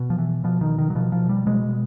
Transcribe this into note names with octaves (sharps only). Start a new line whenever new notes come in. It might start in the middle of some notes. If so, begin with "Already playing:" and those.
Already playing: B2
F3
E3
B2 F3
D#3
D#3
F#3
B2 F3
F3
G3
B2 G#3